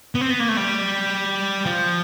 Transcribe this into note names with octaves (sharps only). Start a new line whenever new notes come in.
B3
C4
B3
A#3
A3
G3
F3